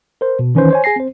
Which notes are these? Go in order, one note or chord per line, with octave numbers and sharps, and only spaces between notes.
A#4 C5
B2
D#3 E3 C#4 D#4 B4 C5
C5 C#5 G#5
G#4 G#5 A#6 C7
C4 C5